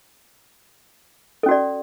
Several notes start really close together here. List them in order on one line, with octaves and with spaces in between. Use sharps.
A4 C#4 F#4 D5